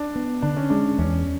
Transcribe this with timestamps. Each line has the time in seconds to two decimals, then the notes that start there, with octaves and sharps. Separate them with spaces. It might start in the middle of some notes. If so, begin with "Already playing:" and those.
Already playing: D4
0.15 B3
0.42 D3 D4
0.56 C#4
0.70 G#3 D4
0.98 E2 C#4